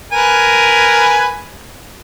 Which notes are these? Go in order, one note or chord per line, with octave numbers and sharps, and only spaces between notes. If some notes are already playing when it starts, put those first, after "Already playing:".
A#4 B4 G#5